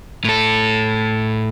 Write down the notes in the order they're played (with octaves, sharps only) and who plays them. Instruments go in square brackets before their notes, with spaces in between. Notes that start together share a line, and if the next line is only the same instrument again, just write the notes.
[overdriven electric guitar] A2 A4